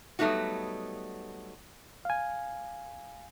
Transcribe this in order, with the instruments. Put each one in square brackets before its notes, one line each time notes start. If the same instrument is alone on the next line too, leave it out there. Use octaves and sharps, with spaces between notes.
[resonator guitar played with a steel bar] F#3 G3 A3 B3 D#4 F#4
[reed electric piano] F5 G#5